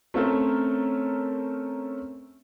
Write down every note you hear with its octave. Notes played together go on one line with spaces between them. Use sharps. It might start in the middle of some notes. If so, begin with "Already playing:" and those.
A3 C4 C#4 A4 A#4